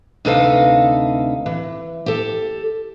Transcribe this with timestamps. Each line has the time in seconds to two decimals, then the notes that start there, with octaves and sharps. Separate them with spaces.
0.25 D2 C3 D#4 A4 B4 F5
1.46 E3
2.06 G4 A4